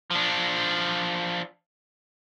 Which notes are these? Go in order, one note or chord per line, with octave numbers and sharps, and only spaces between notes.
F3 D4